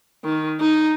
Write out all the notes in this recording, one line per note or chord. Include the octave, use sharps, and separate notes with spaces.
D#3
D#4